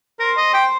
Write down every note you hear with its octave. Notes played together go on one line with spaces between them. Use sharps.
A#4 C5
D#5
G5